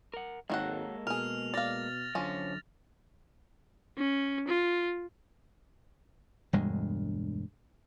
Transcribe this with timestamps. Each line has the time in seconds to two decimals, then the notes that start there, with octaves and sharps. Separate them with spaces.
0.14 A#4 F#5
0.50 G#1 D#3 F#3 G#3 A#3 A4 F#5
1.07 B2 G#4 A#4 F6 F7
1.54 D5 F5 A6 A#6
2.15 F#2 D3 F3 C#4
3.97 C#4
4.48 F4
6.53 E1 D2 G2 G#3